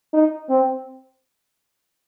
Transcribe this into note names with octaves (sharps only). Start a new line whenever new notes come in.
D#4
C4